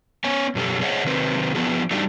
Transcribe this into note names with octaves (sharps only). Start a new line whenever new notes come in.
B3 C#4 C#5 G#5
F#2 B2 C#4 G4 A4
G#4 C5 C#5 D#5 F#5
C3 D#3 F#3 C4 B4 C5
F3 B3 D4 E4 F#4 G#4
G3 A3 D4 D#4 F#4 G4